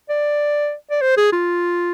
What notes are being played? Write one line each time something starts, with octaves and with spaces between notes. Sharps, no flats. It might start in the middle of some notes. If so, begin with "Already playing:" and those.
D5
D5
C5
G#4
F4